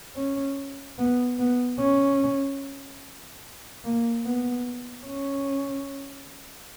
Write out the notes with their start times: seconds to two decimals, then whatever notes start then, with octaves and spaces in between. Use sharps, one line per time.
0.16 C#4
0.98 B3
1.39 B3
1.79 C#4
3.84 A#3
4.25 B3
5.07 C#4